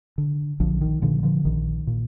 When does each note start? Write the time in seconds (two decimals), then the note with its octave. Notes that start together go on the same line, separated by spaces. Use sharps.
0.18 D3
0.60 A#1 D3 F3
0.81 D#3
1.02 A#2 D3 F3
1.23 D3 F3
1.45 A#1 D#3
1.87 A#2